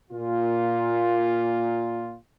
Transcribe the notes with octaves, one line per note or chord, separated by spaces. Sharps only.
A#2 F4